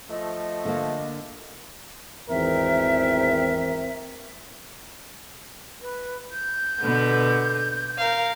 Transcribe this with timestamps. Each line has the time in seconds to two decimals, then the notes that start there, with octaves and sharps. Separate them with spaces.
0.10 F3 A3 D#5
0.65 D3 A#3
2.30 G#1 E2 D#3 E3 C4 A#4 E5
5.82 B4
6.31 G6
6.81 B2 D3 B3
7.99 A#4 F5